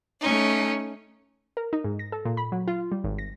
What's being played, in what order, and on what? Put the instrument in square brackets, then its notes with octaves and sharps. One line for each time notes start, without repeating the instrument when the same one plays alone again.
[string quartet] A3 C#4 D#4
[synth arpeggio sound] A#4
D#4
G#2
A#6
A4
A#2
B5
F#3
F4
G3
G#1
A#6